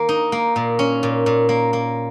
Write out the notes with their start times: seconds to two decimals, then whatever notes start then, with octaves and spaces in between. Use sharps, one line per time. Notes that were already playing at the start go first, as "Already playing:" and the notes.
Already playing: D#3 A#3
0.09 D#4
0.32 A#3
0.56 A#2
0.79 C#4
1.03 A#2
1.26 A#2
1.49 A#3
1.73 A#3